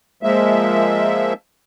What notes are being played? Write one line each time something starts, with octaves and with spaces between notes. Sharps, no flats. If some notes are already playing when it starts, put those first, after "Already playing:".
F3 G#3 A#3 E5